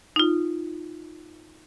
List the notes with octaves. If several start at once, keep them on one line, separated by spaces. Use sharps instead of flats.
D#4 F4